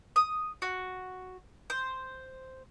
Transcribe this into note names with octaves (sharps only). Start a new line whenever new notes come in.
D#6
F#4
C5